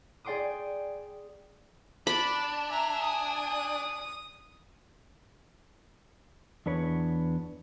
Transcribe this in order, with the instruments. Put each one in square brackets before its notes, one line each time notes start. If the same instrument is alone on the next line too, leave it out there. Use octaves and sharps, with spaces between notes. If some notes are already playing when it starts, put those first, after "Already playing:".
[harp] G#4 D5 G5 C6 D6 D#6
[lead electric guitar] D4 [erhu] D5 [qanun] B5
[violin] E5 A#5 [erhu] G#5
[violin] D#6
[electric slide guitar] E2 D4 B4 C#5